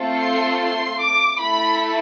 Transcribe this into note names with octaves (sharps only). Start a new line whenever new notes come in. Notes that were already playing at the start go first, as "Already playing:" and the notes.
Already playing: A3 C4 F4 A4
C6
C6
D6
A3 E4 A4 B5